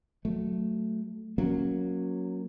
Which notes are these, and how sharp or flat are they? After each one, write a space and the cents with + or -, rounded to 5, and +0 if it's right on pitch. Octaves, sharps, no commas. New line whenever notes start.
F#3 +0 A3 +0
F#3 -10 A#3 +0 C#4 +0